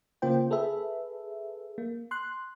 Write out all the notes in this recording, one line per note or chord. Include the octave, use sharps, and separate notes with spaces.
C#3 A#3 F4 C5 G5
G#4 A4 B4 E5
A#3
C6 F#6